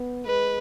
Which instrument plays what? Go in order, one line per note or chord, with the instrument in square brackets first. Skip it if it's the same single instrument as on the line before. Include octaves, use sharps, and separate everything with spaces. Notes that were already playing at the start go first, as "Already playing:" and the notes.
Already playing: [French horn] B3
[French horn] G#3 [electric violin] B4